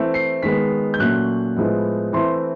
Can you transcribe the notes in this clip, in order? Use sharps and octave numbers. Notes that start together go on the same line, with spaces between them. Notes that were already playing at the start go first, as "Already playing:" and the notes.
Already playing: E3 A3 C4
C7
D#3 G#3 B3 B6
G6
A#2 F#3 A3 C#4 F#6
A2 F3 G#3 B3
E3 A3 C4 C6